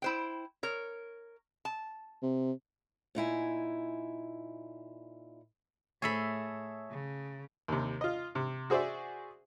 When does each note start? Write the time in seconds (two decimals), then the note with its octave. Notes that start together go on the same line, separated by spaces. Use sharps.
0.02 E4 C5 G5
0.63 A#4 C#5
1.65 A5
2.22 C3
3.15 A#2 D#4 E4 G#5
6.02 A2 G#4 A4 C#5 E5 B5
6.91 C#3
7.68 D#2 C3
8.01 F4 D#5
8.35 C3
8.70 F#4 G#4 C5 D5 E5